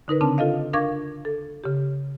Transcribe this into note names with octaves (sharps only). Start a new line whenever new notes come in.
D3 D#4 A#4 B4
C#3 C4 D4 A5
F4 A4 D#5 F5
D4 A#4 F5 C#6 D6 G#6
A4
C#3 G4